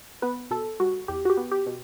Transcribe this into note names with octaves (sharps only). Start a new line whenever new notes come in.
B3 B4
B2 A4
G3 F#4
E2 G4
F#4
G4
B3
G4
B2